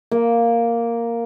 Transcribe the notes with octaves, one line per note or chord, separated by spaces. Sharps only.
A#3